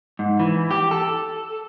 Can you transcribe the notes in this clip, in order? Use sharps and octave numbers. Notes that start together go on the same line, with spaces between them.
G#2
E3
G4
A4